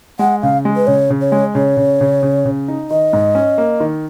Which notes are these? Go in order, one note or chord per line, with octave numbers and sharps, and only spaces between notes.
G#3 F#5
C#3 F5
G#3
B4
C#3 C#5
C#3
C#5
G#3
C#3 C#5
C#3
C#3
C#3
C#3
D#4
D#3 D#5
G#2
C#4
A#3
D#3